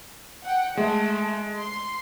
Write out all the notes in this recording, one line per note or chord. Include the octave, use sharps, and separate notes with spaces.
F#5 G5
G#3 A3
C6